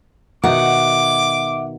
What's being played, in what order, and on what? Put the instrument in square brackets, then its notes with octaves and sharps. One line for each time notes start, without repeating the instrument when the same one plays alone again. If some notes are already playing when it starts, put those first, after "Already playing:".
[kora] B2 D#3 [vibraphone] E5 [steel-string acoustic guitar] F#5 [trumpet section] D6